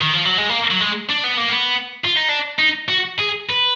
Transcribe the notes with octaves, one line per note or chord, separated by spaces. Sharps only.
D#3
F3
F#3
G#3
A#3
F#3
G#3
D4
B3
A#3
B3
F4
D#4
D4
D#4
F#4
G#4
B4